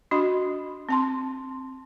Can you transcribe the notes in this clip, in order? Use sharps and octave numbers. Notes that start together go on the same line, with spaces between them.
D4 F#4 D#5 B5
C4 A5 C6